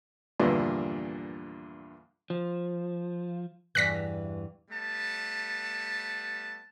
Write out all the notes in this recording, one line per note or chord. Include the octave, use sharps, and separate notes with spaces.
E2 G2 A#2 D3 F3 B4
F3
E2 G2 E3 F#6 A#6 B6
G3 A3 B3 A5